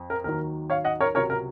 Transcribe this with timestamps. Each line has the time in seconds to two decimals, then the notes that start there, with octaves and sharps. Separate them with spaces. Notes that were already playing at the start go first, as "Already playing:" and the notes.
Already playing: F2
0.10 A#4
0.24 D#2 D#3 F#3 A#4
0.70 C#5 F5
0.85 D#5 F#5
1.00 A#4 C#5
1.15 C#2 C3 F#3 A#4 C#5
1.30 A#4